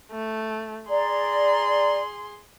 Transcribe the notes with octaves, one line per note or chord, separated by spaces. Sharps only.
A3
G#4 D5 A#5 C6